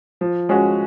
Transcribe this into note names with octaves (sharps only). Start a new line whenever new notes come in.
F3
G#3 C#4 F#4